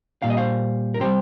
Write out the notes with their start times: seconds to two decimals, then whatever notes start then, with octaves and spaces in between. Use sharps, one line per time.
0.22 A#2 G3 F5
0.30 D#5
0.37 C5 F5
0.94 A#4
1.00 C3 G3 G4 C5